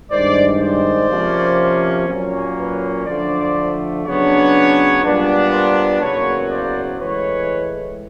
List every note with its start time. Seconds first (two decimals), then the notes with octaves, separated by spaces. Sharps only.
0.12 G2 D#3 G#3 C5 D5
0.61 C5 D5
1.10 C3 F3 A#3 C#4
2.08 A#2 F#3 A#3 C#4
2.57 B4 C#5
3.06 D3 F3 A3 D4 C5 D5
4.05 C#3 F#3 B3 D4 B4 C#5
5.03 A#2 G3 B3 D4
5.52 A#4 C5
6.01 E2 C#3 F#3 A#3 B4 C#5
6.51 C5 D5
6.99 A2 E3 G#3 B4 C#5